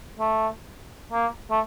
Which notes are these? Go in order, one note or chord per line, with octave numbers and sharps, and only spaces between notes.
A3
A#3
A3